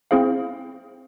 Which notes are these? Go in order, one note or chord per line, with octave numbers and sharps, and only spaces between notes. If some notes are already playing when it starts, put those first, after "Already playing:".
C4 E4 G#4 C5 F5